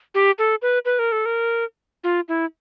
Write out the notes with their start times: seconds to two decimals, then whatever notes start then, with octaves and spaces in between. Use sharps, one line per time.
0.14 G4
0.39 A4
0.62 B4
0.85 B4
0.99 A#4
1.12 A4
1.26 A#4
2.04 F4
2.28 E4